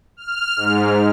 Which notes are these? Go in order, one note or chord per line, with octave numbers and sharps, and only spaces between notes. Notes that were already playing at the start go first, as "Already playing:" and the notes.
F6
G#2